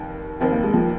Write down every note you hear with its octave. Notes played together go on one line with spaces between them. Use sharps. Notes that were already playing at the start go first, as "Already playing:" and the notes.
Already playing: F1 D#2 D#3
F1 D#2 D#3 C4
A#3
G#3
F3 A#3